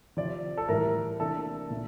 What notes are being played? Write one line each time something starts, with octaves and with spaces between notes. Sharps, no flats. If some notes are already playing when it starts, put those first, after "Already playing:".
C3 F3 C4 D5
A4
A2 E3 G3 A#4
C3 E3 A#3 D4 A4
A#2 A3